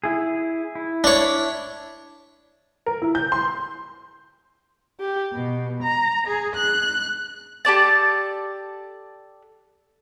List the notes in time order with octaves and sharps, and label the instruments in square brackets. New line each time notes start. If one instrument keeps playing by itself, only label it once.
[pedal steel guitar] E4 G#4
E4
[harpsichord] D4 C#5
[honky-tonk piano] A#4
E4
G6
C6
[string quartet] G4
B2
A#5
G#4
F#6
[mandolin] G4 A4 D5 A5